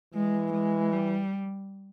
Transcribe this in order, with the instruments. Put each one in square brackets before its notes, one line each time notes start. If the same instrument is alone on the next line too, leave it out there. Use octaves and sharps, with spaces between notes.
[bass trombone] E3 [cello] G#3
[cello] G#3
G3